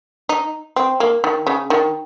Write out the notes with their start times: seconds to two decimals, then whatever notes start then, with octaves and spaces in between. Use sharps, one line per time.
0.29 D#4
0.76 C4
1.00 A#3
1.24 D#3
1.47 C#3
1.70 D#3